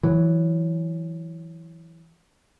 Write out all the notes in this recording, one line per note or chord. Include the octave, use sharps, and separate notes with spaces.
E3 F#3